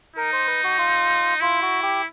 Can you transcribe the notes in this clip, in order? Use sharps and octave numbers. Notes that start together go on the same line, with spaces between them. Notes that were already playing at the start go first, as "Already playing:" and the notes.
D#4 A#4
C5
B4
F#4
F4
E4 F4
F#4
G4